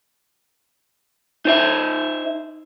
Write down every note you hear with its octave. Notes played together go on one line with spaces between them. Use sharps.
D#4 C5 E5